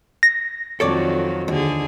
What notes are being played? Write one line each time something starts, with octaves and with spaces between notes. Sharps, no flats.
A#6
F2 D#3 F#3 A4 C#5 D5
D#2 D3 G#4